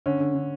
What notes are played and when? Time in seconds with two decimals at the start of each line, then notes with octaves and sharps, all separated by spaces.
0.06 D3 C#4
0.20 D3
0.35 D3